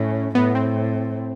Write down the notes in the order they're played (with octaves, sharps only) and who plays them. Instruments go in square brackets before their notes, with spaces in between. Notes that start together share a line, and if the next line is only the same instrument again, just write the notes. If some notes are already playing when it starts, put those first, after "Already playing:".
Already playing: [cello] A2 [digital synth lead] C#4
[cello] A2 [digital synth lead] B3
[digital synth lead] C4